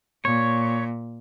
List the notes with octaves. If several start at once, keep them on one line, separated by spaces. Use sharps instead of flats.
A#2 C#5